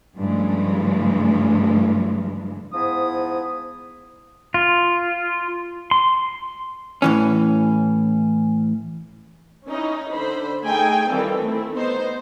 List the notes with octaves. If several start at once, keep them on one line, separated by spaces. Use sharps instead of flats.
G2 C#3 E3 F3 G#3 A3
G#2 F3 B3 E4 D#6
F4
C6
A2 E3 C#4
C#4 D#4 E4
D3 C5 B5
A3 D#4 G#4 G5 G#5
D#3 E3 G3 C4 F4 A4
A3 C4 E4
B3 D#4 C5